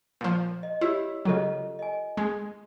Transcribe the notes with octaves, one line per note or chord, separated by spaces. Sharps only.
A#2 F3
D#5
E4 G4 C#5 E6
C#3 F#3 F4 A4 D#5
D#5 G#5
G#3